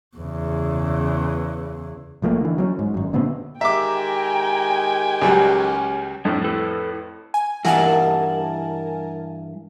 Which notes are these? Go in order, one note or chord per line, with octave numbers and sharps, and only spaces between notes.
E2 C#3
B1 F3 A3 A#3
D3 E3
F#3 A#3 C#4
G#2
G#1 F#2
A#2 D3 B3 C4
D#3 G#3 G4 E5 G5 G#5 A#5 D6
C#2 F#3 G3 C#4
F2 A2 G3 D4 A4
E4 A4 B4
G#5
G2 E3 A#4 F#5 G#5 A5